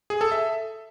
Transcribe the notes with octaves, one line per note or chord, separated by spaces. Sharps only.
G#4
A4
E5